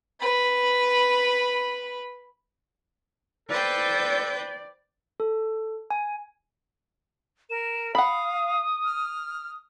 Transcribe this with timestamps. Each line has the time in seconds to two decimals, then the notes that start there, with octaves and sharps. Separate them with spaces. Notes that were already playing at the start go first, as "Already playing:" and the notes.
0.20 B4 B5
3.49 A4 B4 C5 D5 G5
5.20 A4
5.90 G#5
7.50 A#4 E7
7.95 F5 F#5 B5 D#6
8.85 F6